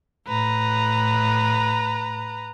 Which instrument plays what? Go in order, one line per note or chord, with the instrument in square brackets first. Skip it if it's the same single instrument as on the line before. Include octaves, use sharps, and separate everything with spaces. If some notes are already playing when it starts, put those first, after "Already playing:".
[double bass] A2 [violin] B4 A#5